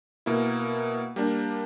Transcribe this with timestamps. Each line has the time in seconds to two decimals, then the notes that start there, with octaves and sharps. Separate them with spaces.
0.26 B2 A#3 E4
1.16 G3 A#3 D4